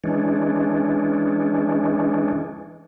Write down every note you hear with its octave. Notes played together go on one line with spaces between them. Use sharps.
E3 G#3 C#4 D4